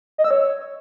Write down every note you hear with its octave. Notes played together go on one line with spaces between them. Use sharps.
D#5
E6
C#5